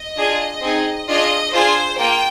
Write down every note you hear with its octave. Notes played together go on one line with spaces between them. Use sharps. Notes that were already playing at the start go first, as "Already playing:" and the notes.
Already playing: D#5
D4 F4 G#4
C4 D#4 G#4
D4 F4 G#4 D#5
D4 F4 G#4 C5
A#3 F4 G5